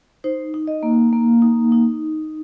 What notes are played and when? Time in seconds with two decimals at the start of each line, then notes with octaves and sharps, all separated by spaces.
0.24 D#4 C5
0.54 D#4
0.67 D#5
0.83 A#3
1.13 A#3
1.42 D#4
1.72 D#4